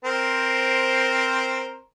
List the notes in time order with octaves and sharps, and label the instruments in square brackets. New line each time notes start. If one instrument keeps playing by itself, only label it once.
[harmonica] C4 A#4 C5